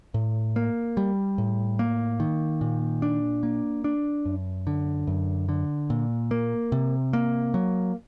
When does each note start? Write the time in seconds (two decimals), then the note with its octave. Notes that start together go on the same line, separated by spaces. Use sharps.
0.14 A2
0.56 A#3
0.97 G3
1.38 A2
1.79 A#3
2.20 D#3
2.61 A#2
3.02 D4
3.43 A#3
3.84 D4
4.25 F#2
4.67 D3
5.07 F#2
5.49 D3
5.90 A#2
6.31 A#3
6.72 C3
7.13 A#3
7.54 F#3